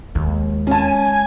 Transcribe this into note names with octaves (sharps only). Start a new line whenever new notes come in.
D#2 G#3
C#4 G#5 A5